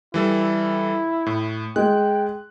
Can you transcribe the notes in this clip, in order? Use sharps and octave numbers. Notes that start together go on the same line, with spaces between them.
E3 G3 E4 A4
A2
G#3 G5 F#6